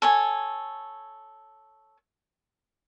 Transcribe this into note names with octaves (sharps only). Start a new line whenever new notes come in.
A4 C#5 G#5